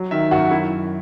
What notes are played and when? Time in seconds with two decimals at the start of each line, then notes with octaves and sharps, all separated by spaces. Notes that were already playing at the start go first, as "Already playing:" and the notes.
Already playing: F#3
0.11 D#3 E5
0.31 F#2 F#4
0.51 E4